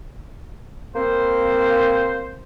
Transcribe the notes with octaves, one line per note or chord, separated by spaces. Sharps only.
A#3 C4 C5